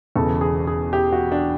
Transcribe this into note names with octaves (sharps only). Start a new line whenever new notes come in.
E1 E2 C#3 E3 A4
G#4
G#4
G4
F#4
D4